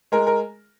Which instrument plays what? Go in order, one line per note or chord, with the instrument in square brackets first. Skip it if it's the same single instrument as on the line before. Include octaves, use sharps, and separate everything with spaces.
[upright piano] G#3 A#4
A#4